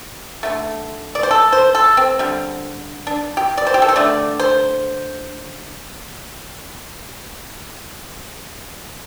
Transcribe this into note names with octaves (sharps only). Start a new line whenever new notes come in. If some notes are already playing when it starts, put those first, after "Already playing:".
D3 A3
D5
C5
A4
C5
A4
C4
D3 G3
D4
G4
D5
C5
G4
A4
C5
D3 A3 D5
C5